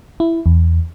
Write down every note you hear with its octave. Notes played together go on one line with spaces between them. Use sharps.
E4
E2